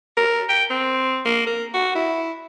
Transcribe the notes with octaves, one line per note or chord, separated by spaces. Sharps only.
A#4
G5
C4
A#3
A#4
F#4
E4